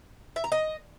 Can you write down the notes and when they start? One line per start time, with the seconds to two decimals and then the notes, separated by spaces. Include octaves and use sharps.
0.36 E5
0.44 A#5
0.52 D#5